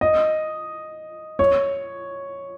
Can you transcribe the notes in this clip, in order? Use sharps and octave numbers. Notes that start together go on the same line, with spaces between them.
D#5
C#5